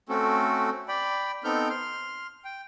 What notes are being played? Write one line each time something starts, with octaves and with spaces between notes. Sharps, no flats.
A3 C4 C#4 F#4 A4
D5 G5 B5
B3 C4 D#4 A4 F6 G6
C6 F6
G5